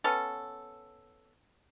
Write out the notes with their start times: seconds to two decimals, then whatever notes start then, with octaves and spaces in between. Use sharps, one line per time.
0.04 B3 C#4 A4